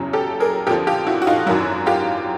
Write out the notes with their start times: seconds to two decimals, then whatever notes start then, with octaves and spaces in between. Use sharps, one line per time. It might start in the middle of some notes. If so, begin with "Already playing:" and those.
Already playing: F#1 E2 C#3 F#3
0.13 G4 A4
0.40 G#4 A#4
0.67 F2 D3 F3 G4 A4
0.87 F4 G4
1.07 E4 F#4
1.22 F#4
1.27 D#4 F4
1.46 G#1 F#2 D#3 F#3 E4 F#4
1.86 F4 G4